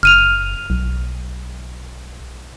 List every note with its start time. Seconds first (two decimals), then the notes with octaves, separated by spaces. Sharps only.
0.03 F#1 F6 D#7 F7
0.70 B1